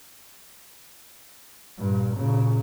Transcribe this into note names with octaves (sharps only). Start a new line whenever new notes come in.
G2 A#2
A#2 C#3